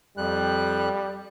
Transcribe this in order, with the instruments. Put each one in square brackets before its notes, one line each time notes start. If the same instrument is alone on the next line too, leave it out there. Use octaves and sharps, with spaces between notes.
[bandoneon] F2 F#6 [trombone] G3